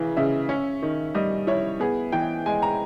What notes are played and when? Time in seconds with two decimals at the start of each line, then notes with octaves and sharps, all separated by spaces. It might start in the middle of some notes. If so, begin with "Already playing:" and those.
Already playing: C#3 E3
0.17 C#3 E5
0.49 C#4
0.82 D#3
1.15 G3 D#5
1.47 E4 C#5
1.80 B3 G#4
2.12 E3 G5
2.46 G#3 G#5
2.62 A#5